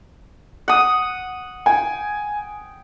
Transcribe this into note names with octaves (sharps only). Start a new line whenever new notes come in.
F#5 D#6
G5 G#5